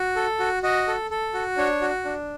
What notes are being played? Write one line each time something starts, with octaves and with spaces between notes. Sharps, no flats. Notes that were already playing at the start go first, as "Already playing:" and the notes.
Already playing: F#4
A4
F#4
F#4 D#5
A4
A4
F#4
D4 C#5
F#4
D4